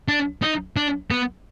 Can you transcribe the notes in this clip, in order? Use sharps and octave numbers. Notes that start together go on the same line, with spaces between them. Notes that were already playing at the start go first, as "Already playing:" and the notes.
D4
D#4
D4
B3